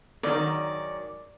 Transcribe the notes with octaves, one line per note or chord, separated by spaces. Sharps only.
G#2 D#3 F#3 D5